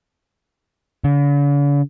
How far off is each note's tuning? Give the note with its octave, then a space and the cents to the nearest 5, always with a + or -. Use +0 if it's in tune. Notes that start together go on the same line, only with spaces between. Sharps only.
D3 -45